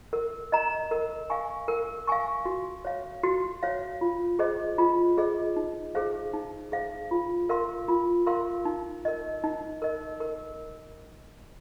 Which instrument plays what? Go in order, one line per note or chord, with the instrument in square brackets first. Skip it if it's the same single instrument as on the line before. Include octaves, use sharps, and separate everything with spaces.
[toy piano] A#4
D#5 A#5
A#4
F5 G#5 C#6
A#4
F5 G#5 C#6
F#4
C#5 F5
F#4
C#5 F5
F4
G#4 C5 D#5
F4
G#4 C5 D#5
D#4
G#4 C5 F5
D#4
G#4 C5 F5
F4
A#4 F5 C6
F4
A#4 F5 C6
D#4
A#4 D#5
D#4
A#4 D#5
A#4